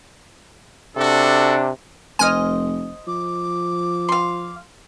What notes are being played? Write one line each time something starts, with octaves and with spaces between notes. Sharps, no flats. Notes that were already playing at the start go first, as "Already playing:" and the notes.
C3 D4 F#4 A4
F1 C5 D#5 G#5 F6
F3 D6
F5 C6